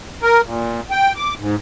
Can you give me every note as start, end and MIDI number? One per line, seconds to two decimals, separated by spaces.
0.22 0.41 70
0.44 0.81 46
0.91 1.13 79
1.16 1.34 86
1.40 1.56 44